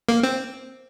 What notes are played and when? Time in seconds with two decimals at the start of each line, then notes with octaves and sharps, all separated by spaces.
0.09 A#3
0.23 C4